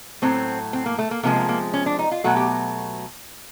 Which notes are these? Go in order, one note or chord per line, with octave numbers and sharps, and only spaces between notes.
A2 F#3 A3 C4
C4
A#3
A3
A#3
C3 F3 G#3 A#3
A#3
A#3
C#4
D4
D#4
F4
B2 F#3 A3 F#4
G4